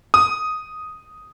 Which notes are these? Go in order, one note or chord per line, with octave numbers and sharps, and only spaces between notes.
D#6